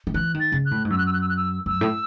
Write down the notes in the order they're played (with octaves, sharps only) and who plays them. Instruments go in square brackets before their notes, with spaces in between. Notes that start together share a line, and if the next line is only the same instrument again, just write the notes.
[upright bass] D#3
[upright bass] E3 [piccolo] F#6
[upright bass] D#3
[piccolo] A6
[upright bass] C#3
[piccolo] F#6
[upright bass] A2
G#2
[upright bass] F#2 [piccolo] E6
[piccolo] F#6
E6
F#6
E6
F#6
E6
[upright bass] F#2 [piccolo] E6
[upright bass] A2